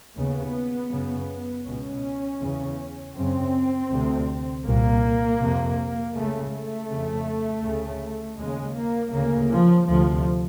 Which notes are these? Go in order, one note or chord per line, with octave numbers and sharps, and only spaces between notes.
D#2 C#3 B3
F#2 C#3
C#2 B2 C#4
E2 C#3
F#2 C#3 C4
D2 C3
C2 A#2 A#3
F2 C3
C#2 C#3 A3
A3
F2 C#3
D2 C#3
D#2 C#3 G#3
A#3
D2 C#3 A#3
F3
D2 C3 F3